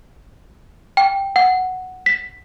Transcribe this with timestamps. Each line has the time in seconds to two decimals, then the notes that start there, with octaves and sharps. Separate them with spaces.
0.97 G5
1.36 F#5
2.06 B6